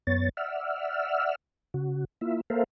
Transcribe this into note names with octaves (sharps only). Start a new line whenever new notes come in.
F#2 B3 C#5 A6
D5 E5 F#5 E6 F6
C#3 F#4
A#3 E4 F4 E5
A#3 A4 A#4 C5 E5 F5